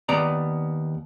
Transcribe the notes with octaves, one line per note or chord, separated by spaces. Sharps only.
D#2 B3 D5 A#5